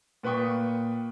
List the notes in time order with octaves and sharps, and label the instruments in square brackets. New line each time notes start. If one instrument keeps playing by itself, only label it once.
[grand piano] A#2 B4 G5 C#6 D#6